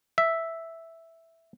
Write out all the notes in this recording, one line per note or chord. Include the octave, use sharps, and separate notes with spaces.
E5